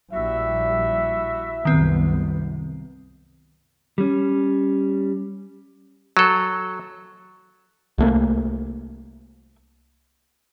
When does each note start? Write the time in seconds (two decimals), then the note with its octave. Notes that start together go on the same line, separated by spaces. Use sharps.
0.13 A#1 G3 E4 F#4 E5
1.65 C2 F#2 D#3 B3 C4
3.98 G3 C#4
6.17 F#3 A4
7.98 C2 A3 A#3